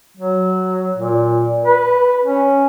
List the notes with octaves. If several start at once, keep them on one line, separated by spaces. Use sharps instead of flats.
F#3
A#2
B4
C#4